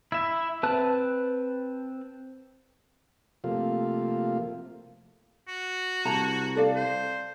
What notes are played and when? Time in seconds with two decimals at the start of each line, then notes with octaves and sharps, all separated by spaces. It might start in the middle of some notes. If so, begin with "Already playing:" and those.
0.12 E4 E5
0.63 C4 B4 A5 F#6
3.44 C3 F3 A3 A#3 F4
5.48 F#4
6.05 C2 A5 A#5
6.56 A4 D5 F5
6.76 C5